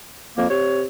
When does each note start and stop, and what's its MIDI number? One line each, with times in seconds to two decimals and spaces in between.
0.37 0.49 41
0.37 0.49 58
0.50 0.84 48
0.50 0.83 73